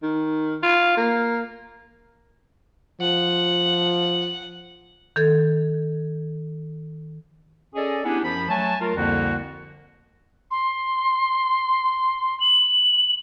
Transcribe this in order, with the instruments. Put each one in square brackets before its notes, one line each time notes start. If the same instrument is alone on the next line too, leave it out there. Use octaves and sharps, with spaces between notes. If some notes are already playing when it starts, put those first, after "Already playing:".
[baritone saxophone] D#3
F4
A#3
[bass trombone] F3 [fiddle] F#5
[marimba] D#3 A4 G#6
[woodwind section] C#4 G#4 A4 D5 D#5
B3 C#4 D4 E4 G4 G#4
F#2 F3 B5
F#3 A3 G#5 A5
F#3 A3 F4 A#4
C2 F2 D3 F3 A#3 F#4
[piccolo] C6
F#7